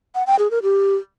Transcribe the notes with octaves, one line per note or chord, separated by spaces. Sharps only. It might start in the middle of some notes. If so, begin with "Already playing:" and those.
F#5
G5
G#4
A#4
G4